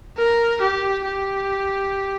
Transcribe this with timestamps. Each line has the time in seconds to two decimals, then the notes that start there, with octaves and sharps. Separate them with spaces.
0.17 A#4
0.61 G4
1.04 G4